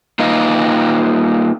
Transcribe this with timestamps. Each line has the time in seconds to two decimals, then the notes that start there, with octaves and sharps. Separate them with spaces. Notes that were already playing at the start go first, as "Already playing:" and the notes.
0.19 A#3 D#4 F4 B4 D#5